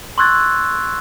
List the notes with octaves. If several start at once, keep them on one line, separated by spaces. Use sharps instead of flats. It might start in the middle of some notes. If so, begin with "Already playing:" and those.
C6 C#6 E6 F#6 G#6 A6